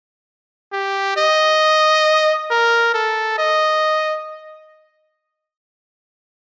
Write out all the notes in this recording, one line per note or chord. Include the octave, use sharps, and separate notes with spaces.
G4
D#5
A#4
A4
D#5